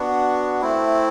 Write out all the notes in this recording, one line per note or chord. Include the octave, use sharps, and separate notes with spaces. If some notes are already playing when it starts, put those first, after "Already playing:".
Already playing: B3 D4 F#4
A3 C4 E4